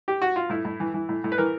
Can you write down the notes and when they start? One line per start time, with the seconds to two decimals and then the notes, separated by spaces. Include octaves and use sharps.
0.08 G4
0.22 F#4
0.36 F4
0.49 A2 E4
0.65 A2
0.80 E3
0.94 E3
1.09 A2
1.24 A2
1.32 B4
1.38 E3 A#4